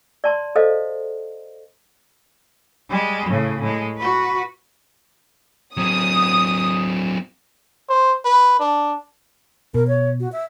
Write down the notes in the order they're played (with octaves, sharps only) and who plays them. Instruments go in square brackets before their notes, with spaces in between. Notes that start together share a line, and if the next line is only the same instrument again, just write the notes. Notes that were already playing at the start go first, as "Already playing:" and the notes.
[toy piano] D5 A5 C6
A4 C5 D#5 F5
[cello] G3 G#3
A2 C#3
A2 G#3
F#4 B4
[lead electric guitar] F#3 C4 [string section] D#6
[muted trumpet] C5
B4
D4
[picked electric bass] B2 [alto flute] A#4
[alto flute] C#5
F#4
E5